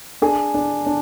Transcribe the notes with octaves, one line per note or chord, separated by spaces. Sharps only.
D4 G#4
D4
D4